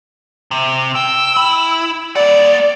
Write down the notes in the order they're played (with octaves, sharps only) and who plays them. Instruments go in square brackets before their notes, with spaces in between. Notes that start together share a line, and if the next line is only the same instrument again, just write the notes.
[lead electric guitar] C3
[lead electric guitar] G5 [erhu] E6
[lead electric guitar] E4
[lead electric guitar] A#3 F#5 [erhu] D5